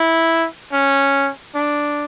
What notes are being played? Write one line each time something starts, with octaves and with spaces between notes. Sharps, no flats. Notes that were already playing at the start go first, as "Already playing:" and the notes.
Already playing: E4
C#4
D4